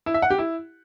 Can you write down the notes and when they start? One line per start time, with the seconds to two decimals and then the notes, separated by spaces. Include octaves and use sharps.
0.06 E4
0.14 E5
0.22 F#5
0.30 G4
0.38 E4